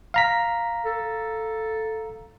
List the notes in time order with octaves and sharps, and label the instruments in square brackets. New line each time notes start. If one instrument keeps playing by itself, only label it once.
[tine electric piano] F5 A#5 B6
[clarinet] A4